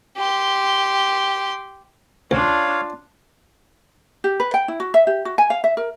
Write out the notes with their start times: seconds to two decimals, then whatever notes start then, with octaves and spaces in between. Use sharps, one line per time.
0.17 G4 C6
2.31 C#2 D4 F4 C#5 F5
4.24 G4
4.40 B4
4.54 G5
4.68 E4
4.80 F#4
4.94 E5
5.07 G4
5.25 F#4
5.38 G#5
5.50 F5
5.64 E5
5.77 A#4